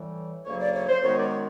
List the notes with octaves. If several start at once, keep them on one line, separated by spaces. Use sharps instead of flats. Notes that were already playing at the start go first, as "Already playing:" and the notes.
Already playing: A2 E3 G3
D2 C#3 F#3 A#3 C#5
D5
C#5
C5
F#2 D#3 G#3 B3 C#5
D5
C#5